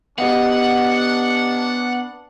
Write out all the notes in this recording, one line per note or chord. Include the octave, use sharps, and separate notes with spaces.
B3 D4 G4 D#5 F5 F#5